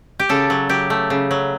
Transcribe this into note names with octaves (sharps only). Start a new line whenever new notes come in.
G4
C#3 A4
F#3
F#3 G4
A3
C#3
F#3